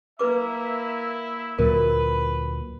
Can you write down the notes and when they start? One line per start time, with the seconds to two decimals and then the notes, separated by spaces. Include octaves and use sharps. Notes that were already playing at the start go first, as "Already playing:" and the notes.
0.19 A#3 E4 B4 E5 D6
1.59 D2 A#2 F#3 A#4 B4